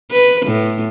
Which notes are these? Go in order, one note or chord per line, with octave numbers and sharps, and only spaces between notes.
B4
A2